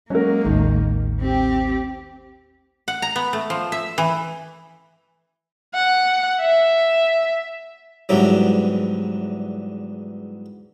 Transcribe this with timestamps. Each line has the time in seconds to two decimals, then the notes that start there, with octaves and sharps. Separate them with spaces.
0.10 F#3 G#3 A#3 C#4 F#4 A#4
0.45 A1 D#2 A2 D#3
1.20 C4 G4
2.88 F#5
3.02 A#5
3.16 B3
3.33 A3
3.50 F3
3.72 E5
3.98 E3
5.74 F#5
6.40 E5
8.09 E2 G#2 D3 E3 F#3 G3